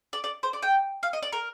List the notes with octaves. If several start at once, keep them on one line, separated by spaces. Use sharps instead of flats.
D5
D5
C5
D5
G5
F5
D#5
D5
A#4